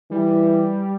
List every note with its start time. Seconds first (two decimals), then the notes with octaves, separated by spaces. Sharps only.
0.11 E3 G3